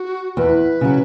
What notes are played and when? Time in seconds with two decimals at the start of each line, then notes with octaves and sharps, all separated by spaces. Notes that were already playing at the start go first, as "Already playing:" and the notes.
Already playing: F#4
0.37 E2 B4
0.81 C#3 F#3